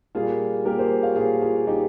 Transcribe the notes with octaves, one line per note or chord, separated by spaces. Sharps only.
A#2 G3 A#3 F4 G#4
A#2 G3 A#3 G4 A#4
G#4 C5
C#5 F5
A#2 G3 A#3 F4 G#4
F4 G#4
A#2 G3 A#3 D#4 G4